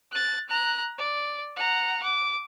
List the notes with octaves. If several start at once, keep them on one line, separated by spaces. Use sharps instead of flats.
F#6 A6
A#5 F#6
D5
F#5 A#5
D6